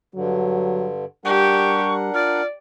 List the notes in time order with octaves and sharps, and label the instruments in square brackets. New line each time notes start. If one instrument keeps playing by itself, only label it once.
[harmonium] G2 D3 [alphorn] F#3
[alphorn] G3 [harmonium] D4 A#4 F#5 [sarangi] G4 [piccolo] C#6
[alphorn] F4 [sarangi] D5 [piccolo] F6